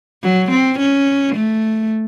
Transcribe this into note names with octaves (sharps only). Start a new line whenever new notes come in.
F#3
C4
C#4
A3